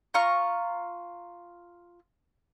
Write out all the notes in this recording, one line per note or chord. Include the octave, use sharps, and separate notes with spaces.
F4 A#5 C#6 F6